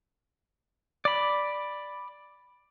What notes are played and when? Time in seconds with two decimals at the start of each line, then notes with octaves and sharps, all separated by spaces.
1.05 D5 B5